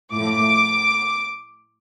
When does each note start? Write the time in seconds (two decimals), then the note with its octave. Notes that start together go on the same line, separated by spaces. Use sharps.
0.12 A2 F3 A3 D6